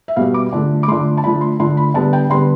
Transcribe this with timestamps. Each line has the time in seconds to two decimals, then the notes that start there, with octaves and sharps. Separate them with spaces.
0.08 E5
0.16 B2 G3 B3 F5
0.34 D6
0.52 D3 F3 A3
0.83 D6
0.88 D3 F3 A3 C6
1.17 A5
1.24 D3 F3 A3 B5
1.41 C6
1.60 D3 F3 A3 C6
1.77 B5
1.94 D3 G3 B3 A5
2.13 G5
2.30 D3 G3 B3 C6